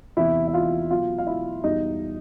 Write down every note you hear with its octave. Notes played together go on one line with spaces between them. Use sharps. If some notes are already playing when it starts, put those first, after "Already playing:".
E2 C3 E3 E4 E5
E5
F4 F5
B2 F#3 F4 F5
F5
E4 E5
E2 B2 G3 D#4 D#5